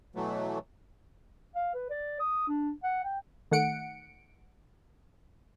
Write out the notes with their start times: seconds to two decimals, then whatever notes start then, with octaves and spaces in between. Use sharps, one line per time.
0.15 B2 E3 F#3 A3
1.55 F5
1.74 B4
1.90 D5
2.20 D#6
2.48 D4
2.83 F#5
3.04 G5
3.51 D#3 A3 F#5 C#7 D7